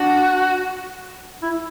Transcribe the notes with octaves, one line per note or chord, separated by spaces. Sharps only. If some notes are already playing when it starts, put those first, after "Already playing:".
Already playing: D4 F#4
E4